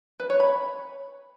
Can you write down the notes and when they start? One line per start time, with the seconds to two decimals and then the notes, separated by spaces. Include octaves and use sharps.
0.20 B4
0.30 C#5
0.40 B5